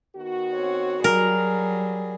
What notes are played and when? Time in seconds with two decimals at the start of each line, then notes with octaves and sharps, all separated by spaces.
0.16 D#3 B3 F#4
0.53 C4 C#5
1.04 F#3 G3 G#4 A#4